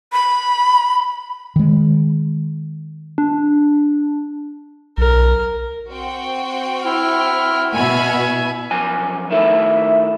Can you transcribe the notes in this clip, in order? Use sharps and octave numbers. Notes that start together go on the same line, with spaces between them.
B5
D#3 G#3
D4
B1 A#4
C4 F#4 G5
E4 F6
B2 E5 F#5 G#5 B5 F6
F#2 F3 G#5
D#3 A3 E4 E5